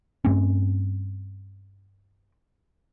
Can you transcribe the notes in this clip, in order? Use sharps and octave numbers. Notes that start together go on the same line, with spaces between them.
G2 A3 C4 C#4